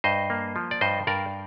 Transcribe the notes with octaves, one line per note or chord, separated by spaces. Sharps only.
G2 C5 D#5
A#3
F3
D5
G2 C5 D#5
G2 A#4 D5